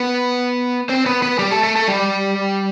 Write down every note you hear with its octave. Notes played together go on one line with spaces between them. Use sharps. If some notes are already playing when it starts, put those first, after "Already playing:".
Already playing: B3 B4
C4 C5
B3 B4
B3 B4
G3 G4
A3 A4
A3 A4
A3 A4
G3 G4